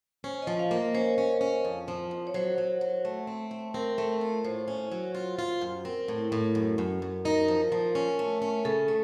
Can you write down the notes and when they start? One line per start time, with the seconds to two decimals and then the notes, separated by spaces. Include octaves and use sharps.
0.24 C#4 C5
0.42 D#5
0.47 F3
0.59 F5
0.71 A#3
0.77 A#4
0.94 C#4 C5
1.18 C#4
1.41 C#4
1.65 F2
1.88 F3
2.11 F2
2.27 C#5
2.34 F#3 C5
2.58 F#3
2.81 F#3
3.05 A3
3.27 C4
3.51 A3
3.74 C4 A#4
3.98 A3
4.21 F4
4.45 A2 C5
4.68 C#4
4.92 F#3
5.15 F4 C5
5.39 F4
5.61 F#2
5.85 C4 A#4
6.08 A2
6.32 A2
6.55 F#2
6.78 F#2
7.02 F#2
7.25 D#4 A#4
7.48 F3
7.72 F3
7.95 C#4
8.19 A3
8.42 C#4
8.65 C#3 A4
8.88 A3